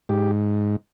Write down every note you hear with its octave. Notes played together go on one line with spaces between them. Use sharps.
G#2 G4